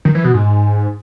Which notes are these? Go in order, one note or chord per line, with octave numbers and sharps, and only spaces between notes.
D#3
E3
B2
G#2